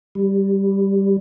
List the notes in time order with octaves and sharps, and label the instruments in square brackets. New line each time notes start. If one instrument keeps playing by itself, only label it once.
[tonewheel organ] G3